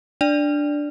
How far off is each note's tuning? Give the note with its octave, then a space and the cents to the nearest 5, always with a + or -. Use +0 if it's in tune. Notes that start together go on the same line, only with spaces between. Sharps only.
D4 +0 D5 +0